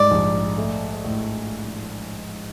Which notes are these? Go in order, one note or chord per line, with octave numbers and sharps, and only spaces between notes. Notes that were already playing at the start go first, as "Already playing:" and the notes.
Already playing: G#2 G3 D5
A#1
A3
A2